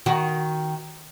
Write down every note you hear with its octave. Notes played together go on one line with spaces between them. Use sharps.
D#3 F#4